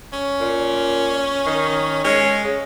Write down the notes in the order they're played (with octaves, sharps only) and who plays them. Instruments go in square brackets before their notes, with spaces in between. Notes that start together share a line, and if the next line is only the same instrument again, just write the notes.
[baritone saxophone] C#4
[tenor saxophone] A#2
D#3
[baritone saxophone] G#3 [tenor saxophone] C#4
[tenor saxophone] C#3